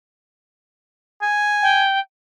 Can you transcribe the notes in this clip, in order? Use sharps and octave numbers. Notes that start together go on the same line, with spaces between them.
G#5
G5